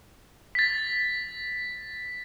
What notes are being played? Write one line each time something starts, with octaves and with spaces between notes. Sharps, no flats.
A6 B6